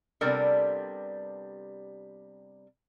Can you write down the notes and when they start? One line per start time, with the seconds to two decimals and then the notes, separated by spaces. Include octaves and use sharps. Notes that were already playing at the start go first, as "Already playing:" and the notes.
0.21 C3 G3 B3 D4 A4 A#4